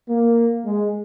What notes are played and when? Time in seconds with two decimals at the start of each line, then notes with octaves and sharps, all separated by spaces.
0.09 A#3
0.65 G#3